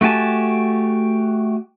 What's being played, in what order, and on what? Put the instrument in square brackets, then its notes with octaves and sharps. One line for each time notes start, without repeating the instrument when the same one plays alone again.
[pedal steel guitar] A3 F#4 G4 G#5 A5